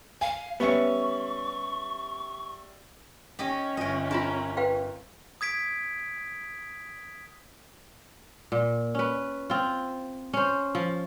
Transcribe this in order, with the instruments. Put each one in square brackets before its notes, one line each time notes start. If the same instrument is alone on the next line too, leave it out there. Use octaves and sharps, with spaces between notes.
[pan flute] F5 [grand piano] G#5
[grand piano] G3 E5 C#7 [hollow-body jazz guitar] B3 C#4 [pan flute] C#6
[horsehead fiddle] C#4 [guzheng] G4 D#5
[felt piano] G1 [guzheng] D#5 G5
[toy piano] D4 F4 [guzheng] A#4 A5 B5
[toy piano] B4 F5 G5
[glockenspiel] D#6 G#6 B6 D7
[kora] A#2
C#4 B4
C4 F4
C#4 C5
F3